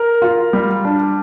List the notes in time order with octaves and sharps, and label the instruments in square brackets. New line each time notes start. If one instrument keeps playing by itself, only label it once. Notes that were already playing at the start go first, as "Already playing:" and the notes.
Already playing: [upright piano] A#4
F4
G3
D4